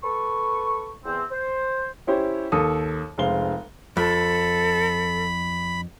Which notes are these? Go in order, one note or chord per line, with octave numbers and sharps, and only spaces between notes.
A4 B4 C#6
E2 C4
C5
C#4 E4 G4 C5 C#5
D#2 A4 D#6
F1 G#3 C4 F5 G7
F2 A4 B5